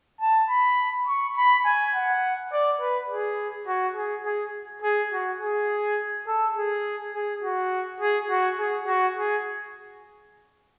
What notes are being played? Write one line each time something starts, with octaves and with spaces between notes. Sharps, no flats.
A5
B5
C#6
B5
G#5
F#5
D5
B4
G#4
F#4
G#4
G#4
G#4
F#4
G#4
A4
G#4
G#4
F#4
G#4
F#4
G#4
F#4
G#4